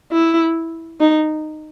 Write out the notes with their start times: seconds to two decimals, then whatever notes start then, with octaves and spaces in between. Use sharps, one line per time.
0.12 E4
1.00 D#4